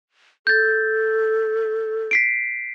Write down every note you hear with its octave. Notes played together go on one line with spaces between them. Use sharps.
A4 G6 A6
B6 C7 D7